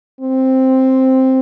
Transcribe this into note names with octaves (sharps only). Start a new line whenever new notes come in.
C4